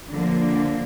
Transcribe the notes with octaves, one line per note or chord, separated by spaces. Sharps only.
D3 F3 A#3